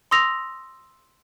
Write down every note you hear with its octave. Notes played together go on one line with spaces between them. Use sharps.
C6 D#6 E6 A#6 F7